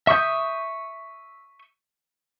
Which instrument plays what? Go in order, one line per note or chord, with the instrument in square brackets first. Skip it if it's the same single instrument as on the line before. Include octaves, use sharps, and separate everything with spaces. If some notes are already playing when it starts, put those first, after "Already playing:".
[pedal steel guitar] E5 C#6 D#6 G6